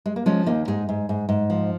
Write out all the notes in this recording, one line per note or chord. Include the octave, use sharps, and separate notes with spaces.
G#3
A#3
F3 G#3 C#4
D#2 A#3 D#4
G#2 D#4 G#4
G#2
G#2
G#2
F3